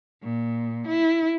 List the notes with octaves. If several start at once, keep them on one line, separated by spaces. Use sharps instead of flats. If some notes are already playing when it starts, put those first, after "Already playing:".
A#2
E4